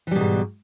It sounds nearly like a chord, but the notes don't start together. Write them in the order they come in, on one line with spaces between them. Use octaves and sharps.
E3 G3 B2 G#2